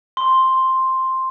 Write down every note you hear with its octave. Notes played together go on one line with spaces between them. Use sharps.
C6